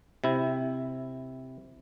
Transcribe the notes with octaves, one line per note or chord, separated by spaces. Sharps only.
C3 E4